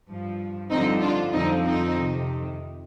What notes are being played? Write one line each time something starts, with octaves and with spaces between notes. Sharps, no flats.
G2 F3
G2 D3 F3 C4 D#4
D4 F4
F2 D3 F3 C4 D#4
C4 D#4
F2 C3 D#3